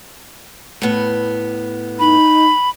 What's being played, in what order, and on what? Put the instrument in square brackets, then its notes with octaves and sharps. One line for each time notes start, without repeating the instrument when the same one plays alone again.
[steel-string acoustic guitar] A2 B3
[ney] D#4 [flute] B5